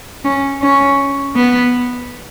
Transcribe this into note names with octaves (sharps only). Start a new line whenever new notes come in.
C#4
C#4
B3